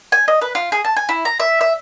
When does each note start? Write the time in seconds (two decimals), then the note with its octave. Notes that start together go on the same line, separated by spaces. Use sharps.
0.12 G#5
0.28 D#5
0.41 B4
0.55 F4
0.72 G#4
0.85 A5
0.97 G#5
1.09 E4
1.25 A#5
1.40 E5
1.61 E5